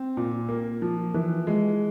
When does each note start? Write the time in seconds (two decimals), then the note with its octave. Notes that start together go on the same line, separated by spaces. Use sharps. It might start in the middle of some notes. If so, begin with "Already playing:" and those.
Already playing: C4
0.17 A#2
0.49 A#3
0.82 F3
1.14 E3
1.47 G#3